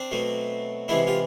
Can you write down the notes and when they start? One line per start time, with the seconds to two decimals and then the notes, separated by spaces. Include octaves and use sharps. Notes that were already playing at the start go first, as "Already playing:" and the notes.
Already playing: C4 D4
0.11 B2 F#3 A3
0.88 C3 E3 G#3 B3 D4 E4
1.07 F4 G4